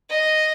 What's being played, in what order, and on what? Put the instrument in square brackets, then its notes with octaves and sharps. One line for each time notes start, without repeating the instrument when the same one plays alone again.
[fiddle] D#5